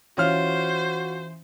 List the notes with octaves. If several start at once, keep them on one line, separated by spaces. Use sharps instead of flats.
E3 C#4 F4 F#4 C5 F6